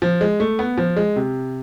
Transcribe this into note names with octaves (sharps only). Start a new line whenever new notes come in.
F3
G#3
A3
B3
F3
G#3
C3